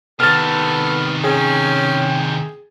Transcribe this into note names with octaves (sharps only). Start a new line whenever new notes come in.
C3 D#3 B3 A4 F6 A6
C#4 G#4 G5